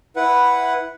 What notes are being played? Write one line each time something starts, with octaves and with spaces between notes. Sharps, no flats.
E4 B4 F#5